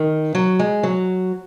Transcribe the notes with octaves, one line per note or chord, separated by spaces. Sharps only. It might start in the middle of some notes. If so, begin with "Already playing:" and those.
Already playing: D#3
F#3
G#3
F#3